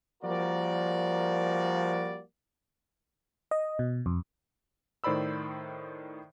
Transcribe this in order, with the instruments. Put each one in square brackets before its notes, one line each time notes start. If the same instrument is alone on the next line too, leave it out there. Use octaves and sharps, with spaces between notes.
[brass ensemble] F3 G3 A#3 F#4 A#4 D5
[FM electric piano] D#5
B2
F2
[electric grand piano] A2 D#3 C5 D5 B5 E6